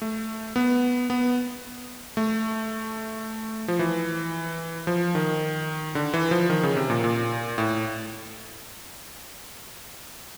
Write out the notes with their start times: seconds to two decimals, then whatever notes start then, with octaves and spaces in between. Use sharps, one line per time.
0.02 A3
0.56 B3
1.10 B3
2.17 A3
3.68 F3
3.79 E3
4.87 F3
5.15 D#3
5.95 D3
6.14 E3
6.31 F3
6.50 D#3
6.63 C#3
6.77 C3
6.90 A#2
7.04 A#2
7.58 A2